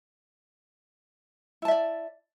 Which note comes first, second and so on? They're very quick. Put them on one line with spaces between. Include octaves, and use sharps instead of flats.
E4 A5 E5 D5